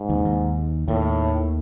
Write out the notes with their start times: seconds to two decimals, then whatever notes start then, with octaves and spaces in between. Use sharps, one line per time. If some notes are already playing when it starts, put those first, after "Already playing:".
Already playing: G#2
0.09 D#2 D#3
0.18 C#3
0.24 D#2 D#3
0.88 D#2 A2 D#3